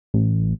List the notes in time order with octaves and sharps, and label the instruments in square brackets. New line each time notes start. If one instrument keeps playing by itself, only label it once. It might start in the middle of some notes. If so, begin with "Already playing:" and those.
[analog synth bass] A1